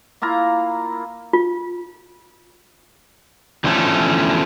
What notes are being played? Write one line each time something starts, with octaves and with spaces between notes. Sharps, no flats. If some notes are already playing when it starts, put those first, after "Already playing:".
A#3 E4 F4 A#5
F4
E2 D3 F3 A3 C#4 A4